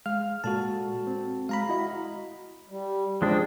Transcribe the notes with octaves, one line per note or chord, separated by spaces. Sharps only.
G#3 F5 F6
A#2 G#3 F#4 A4 A5
C4
G#3 F5 A#5 B5
E4 F#4 D#5
G3
F3 G#3 D4 C5 G5